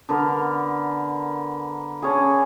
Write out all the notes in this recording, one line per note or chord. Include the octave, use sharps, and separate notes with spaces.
D3 B3 A#4
D3 C#4 G#4